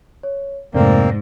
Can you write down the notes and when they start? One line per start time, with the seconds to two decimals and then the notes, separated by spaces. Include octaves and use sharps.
0.23 C#5
0.74 F2 G#2 C3 A3 A#3 C4 D5